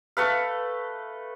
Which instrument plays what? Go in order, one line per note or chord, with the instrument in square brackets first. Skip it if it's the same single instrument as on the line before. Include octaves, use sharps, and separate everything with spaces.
[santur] A3 A4 B4 F5